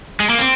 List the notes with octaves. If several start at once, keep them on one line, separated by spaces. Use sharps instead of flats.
G#3
A#3
C4